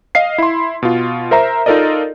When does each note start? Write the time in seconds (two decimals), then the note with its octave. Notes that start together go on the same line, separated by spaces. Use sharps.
0.15 D#5 F5 C7
0.38 E4 C6
0.83 B2 F4
1.31 A#4 C5 E5 A#5
1.66 D#4 F4 A4 A#4 D5 D#5